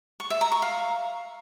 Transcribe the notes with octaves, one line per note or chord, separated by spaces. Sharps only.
C#6
E5
A#5
C#6
F5